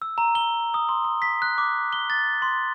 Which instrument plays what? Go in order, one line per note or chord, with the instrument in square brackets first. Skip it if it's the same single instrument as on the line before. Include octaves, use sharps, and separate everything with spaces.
[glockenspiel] E6
A#5
G7
D#6
C6
D#6
B6
F#6
D6
G7
A6
C6